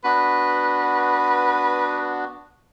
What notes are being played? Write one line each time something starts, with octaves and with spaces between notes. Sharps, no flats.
B3 D4 F#4 B4